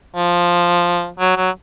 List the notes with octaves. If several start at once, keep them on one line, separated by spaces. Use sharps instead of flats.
F3
F#3
F#3